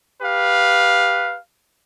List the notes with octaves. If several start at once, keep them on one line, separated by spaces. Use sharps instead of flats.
G4 B4 F5